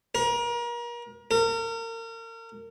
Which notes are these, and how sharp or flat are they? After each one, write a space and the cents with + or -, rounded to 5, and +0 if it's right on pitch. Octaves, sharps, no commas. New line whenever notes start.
A#4 +35
A#4 -35